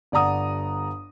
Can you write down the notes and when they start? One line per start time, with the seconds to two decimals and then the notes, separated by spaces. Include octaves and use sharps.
0.12 G1 D5 F#5 A#5 D#6